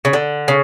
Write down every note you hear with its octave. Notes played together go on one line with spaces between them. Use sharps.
C#3
D3
C#3